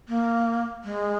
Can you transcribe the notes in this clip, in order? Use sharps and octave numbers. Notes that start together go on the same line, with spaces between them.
A#3
G#3